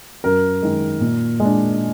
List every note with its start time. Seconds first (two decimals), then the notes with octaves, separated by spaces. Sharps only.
0.24 F#2 A#4
0.62 D#3 G#3
1.00 A#2
1.40 G#3 D4